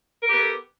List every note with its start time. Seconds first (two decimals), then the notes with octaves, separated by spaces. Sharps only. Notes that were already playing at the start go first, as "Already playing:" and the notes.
0.22 A#4
0.27 G4
0.32 B3
0.37 A4